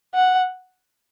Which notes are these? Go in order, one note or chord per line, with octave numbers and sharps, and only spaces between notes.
F#5